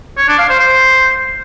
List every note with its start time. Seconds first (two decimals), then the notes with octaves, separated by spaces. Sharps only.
0.18 C#5
0.28 D4
0.38 F5
0.49 C5
0.59 C5